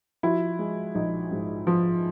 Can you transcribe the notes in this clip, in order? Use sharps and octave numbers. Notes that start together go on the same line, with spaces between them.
F3 E4 F#4
G#3
A#1 D#4
G#2
F3